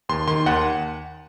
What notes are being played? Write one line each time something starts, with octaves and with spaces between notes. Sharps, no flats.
D#2 C6
D#3 C6
D#2 F#5